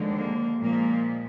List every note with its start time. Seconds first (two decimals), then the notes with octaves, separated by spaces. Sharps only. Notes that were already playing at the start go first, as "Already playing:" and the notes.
Already playing: D#2 D3 F3 G#3
0.20 A#3
0.62 A#2 F3 G#3 A#3